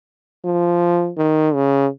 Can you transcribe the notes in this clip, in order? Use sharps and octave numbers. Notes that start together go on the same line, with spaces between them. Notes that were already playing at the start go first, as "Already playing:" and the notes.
F3
D#3
C#3